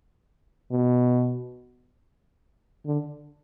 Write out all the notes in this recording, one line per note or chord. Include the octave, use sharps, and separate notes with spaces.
B2
D3